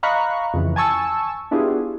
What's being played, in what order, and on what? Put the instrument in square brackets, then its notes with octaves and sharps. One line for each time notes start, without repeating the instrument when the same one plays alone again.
[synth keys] D#5 F5 A#5 B5 C#6 F#6
F2 C#3 E3
G#5 A5 C#6 E6
B3 D4 E4 F4 G4 G#4